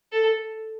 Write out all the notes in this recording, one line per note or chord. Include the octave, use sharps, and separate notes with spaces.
A4